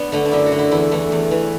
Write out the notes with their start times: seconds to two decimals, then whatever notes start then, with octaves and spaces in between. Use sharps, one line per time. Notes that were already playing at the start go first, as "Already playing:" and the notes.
Already playing: B3 D4
0.12 D3 A3
0.25 D4
0.32 F#2 E4
0.46 F#4
0.52 D3
0.59 E4
0.71 E2 E4
0.91 E3 A3
1.12 E2
1.31 E3